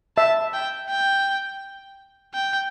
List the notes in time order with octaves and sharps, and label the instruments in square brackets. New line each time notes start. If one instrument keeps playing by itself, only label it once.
[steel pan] E5 [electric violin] A5
[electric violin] G5
G5
G5